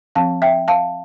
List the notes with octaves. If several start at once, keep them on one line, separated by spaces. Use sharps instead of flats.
F3 C4 F5 A5
E5 G5
F5 A5